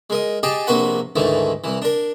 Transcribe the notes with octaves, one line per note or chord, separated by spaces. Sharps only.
G#3 A#4 D#5
G4 G#4 D5 D#5 A5
A#1 C3 A#3 F#4 B4 F#5
D2 G#2 D#3 E3 A3
C2 E3
D4 A#4